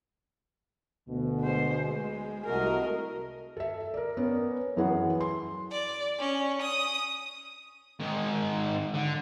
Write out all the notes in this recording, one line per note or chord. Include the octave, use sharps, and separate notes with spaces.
D2 B2
G#3 C5
G#3
C2 A3 F#4 A#4 D#5
A4 E5
A#4 D5
B3 C#4 A#4
F#2 E3 E4 G#4 B4 F#5
C6
D5
C#4
D#6
G#2 D#3
D3